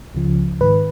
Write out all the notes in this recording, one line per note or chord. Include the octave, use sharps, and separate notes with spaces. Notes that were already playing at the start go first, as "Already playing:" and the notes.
C#2 C#3 F3
G#2 D#3 B4